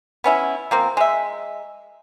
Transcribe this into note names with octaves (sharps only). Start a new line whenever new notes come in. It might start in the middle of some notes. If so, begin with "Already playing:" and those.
B3 C#4 E4
F3 A#3 C4
G#3 E5